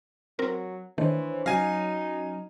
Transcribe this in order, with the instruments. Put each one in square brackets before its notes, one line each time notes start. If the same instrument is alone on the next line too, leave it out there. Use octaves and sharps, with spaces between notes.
[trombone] F#3 [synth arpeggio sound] C4 A#4
[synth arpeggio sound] D#3 A3 [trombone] E3 [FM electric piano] D4 C5 C#5
[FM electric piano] F#3 C#4 F#4 [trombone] D#4 [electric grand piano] F5 G#5 [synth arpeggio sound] A#6